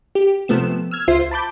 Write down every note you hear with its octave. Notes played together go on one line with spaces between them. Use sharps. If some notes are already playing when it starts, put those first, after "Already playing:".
G4
C3 F3 A3 B3 E7
E6 F6 G#6
C#2 F4 C5 E5 C7
A5 B5 D6 G6